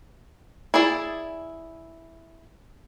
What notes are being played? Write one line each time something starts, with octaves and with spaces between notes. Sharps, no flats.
E4 G#4 D5